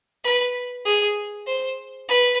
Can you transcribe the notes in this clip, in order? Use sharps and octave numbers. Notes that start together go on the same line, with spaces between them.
B4
G#4
C5
B4